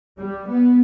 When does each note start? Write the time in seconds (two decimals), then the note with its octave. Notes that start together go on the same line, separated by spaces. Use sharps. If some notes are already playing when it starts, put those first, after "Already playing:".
0.20 G3
0.48 B3